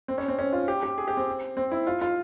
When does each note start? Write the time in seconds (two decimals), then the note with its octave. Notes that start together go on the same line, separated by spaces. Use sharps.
0.08 C4
0.18 C#4
0.28 C4
0.39 C#4
0.53 F4
0.68 G4
0.83 G4
0.98 G#4
1.08 G4
1.17 C4
1.57 C4
1.72 E4
1.87 F4
2.01 F4